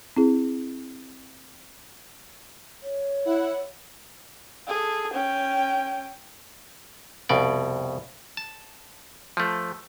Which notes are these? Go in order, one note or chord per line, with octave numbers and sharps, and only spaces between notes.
C4 E4 G#4
C#5
E4 F#5
G#4 A4
C#4 G5
C2 F2 B2 D5
A5
F3 A3